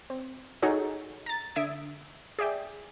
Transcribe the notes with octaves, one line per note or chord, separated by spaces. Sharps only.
C4
D#4 F#4 G#4 A4 C#5
A#5 A6
D3 E5 D#6 G#6 D7
G#4 D5 E5 G5